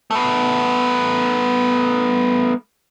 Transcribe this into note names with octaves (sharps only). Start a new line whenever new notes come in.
A3 B3